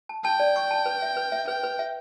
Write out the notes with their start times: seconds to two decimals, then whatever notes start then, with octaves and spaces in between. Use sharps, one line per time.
0.09 A5
0.24 G5 A5
0.40 D5
0.56 C#6
0.71 A5
0.86 B4
1.02 E5
1.17 B4
1.32 E5
1.48 B4 G5
1.63 B4
1.79 E5